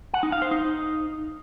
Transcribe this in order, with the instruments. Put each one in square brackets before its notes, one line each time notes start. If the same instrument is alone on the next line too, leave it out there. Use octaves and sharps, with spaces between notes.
[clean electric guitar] F#5
D#4
F5
C5
D#4